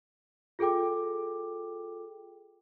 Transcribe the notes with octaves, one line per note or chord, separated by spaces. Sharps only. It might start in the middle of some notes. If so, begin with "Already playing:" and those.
F4 G#4 A4 G5 D6